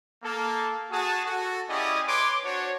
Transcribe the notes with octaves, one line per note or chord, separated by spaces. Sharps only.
A#3 A4
F#4 G#4 A5
F#4 A4
C#4 E4 G4 G#4 D5 D#5
B4 C#5 C6 D6
D4 F#4 C5 C#5